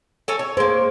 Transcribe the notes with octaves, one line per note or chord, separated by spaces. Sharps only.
A4 C#5 G#5
C#5
G#3 A#3 C5